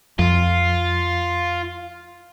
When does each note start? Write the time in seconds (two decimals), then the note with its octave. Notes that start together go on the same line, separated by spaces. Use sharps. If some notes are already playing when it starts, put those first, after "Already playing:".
0.19 F2 F4